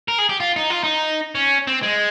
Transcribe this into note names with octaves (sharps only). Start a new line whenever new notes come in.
A#4
G#4
G4
F4
D#4
F4
D#4
C#4
C4
G#3